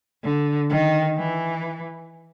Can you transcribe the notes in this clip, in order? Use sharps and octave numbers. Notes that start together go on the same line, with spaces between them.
D3
D#3
E3